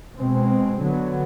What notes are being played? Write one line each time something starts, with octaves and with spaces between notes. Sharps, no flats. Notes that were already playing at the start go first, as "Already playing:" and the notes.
B2 G#3 C4
D3 F#3 B3